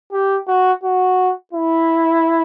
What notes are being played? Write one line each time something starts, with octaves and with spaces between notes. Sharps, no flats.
G4
F#4
F#4
E4